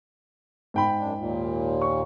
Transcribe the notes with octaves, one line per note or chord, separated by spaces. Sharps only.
G#2 G5 B5
F#2 D4
D#2 A#2
C#6